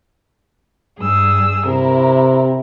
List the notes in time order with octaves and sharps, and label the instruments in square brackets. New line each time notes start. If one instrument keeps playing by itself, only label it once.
[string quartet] G2 G#4 E6
[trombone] C3 [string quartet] E4 A#4